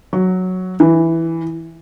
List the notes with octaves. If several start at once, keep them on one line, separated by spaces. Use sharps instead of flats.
F#3
E3